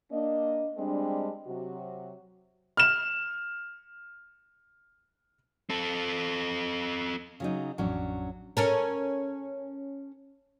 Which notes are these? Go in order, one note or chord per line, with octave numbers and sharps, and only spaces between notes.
A#3 D4 D#5
G3 G#3 C4 D4
C3 F#3 F#4
F6 E7
C4 A4
C#3 F#3 D#4
A1 F2 F#3 C#4 D4
C#4 A4 A#4